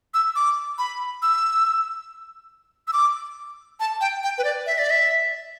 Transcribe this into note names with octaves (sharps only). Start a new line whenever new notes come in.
E6
D6
B5
E6
E6
D6
A5
G5
G5
B4
D5
E5
D5
E5